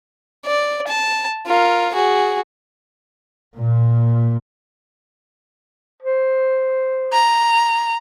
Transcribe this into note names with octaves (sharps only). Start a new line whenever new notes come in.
D5
A5
F4 A#4
F#4 G#4
A#2
C5
A#5